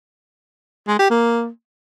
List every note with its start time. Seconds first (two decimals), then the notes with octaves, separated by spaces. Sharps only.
0.88 G#3
0.99 G4
1.10 A#3